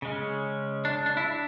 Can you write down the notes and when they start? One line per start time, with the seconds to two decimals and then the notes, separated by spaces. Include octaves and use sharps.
0.02 C#3 G#3 C#4
0.85 D4
1.06 D4
1.17 E4
1.27 D4